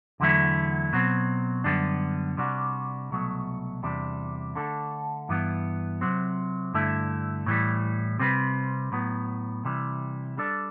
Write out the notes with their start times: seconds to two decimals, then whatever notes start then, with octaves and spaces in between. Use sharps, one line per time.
0.20 E2 D3 F#3 A3 E4
0.93 B2 F#3 C4
1.64 F#2 D3 G3 B3 D4
2.37 C3 G3 D4 F#4
3.11 C2 B2 F#3 A3
3.83 E2 C3 G3 D4
4.55 D3 A3 D4 A4
5.29 G2 E3 B3
6.01 C3 F#3 C4
6.74 G2 D3 A3 E4
7.46 A2 E3 G3
8.19 C3 G3 C4 G4 B4
8.92 A2 F#3 B3
9.65 C3 E3 G3
10.37 G3 D4 A4 D5